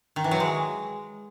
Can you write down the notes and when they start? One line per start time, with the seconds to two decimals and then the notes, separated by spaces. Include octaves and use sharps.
0.16 D#3
0.24 E3
0.31 F#3
0.40 G#3